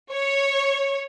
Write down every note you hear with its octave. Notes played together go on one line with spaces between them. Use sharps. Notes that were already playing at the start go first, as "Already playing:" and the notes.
C#5